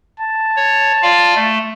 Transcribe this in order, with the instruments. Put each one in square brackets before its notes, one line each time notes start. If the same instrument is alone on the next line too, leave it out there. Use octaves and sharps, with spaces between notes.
[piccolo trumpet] A5
[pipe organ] C#5
F4 D5 F5
A3